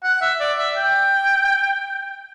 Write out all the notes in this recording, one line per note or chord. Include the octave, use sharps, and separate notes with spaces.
F#5
E5
D5
E5
G5